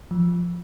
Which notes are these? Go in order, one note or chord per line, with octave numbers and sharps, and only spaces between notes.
F3